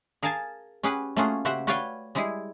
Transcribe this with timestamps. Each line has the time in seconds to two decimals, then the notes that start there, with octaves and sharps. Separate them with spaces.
0.23 G#4 A#4 F5 G#5 A5
0.83 C#4 G4 G#4 B4 F#5
1.16 A3 A#3 C#4 F4 F#4 G#4
1.45 C#3 F#4 G4 C5 E5 F#5
1.67 F#4 B4 C#5 D5 F5 G5
2.15 G3 G#3 E4 G4 G#4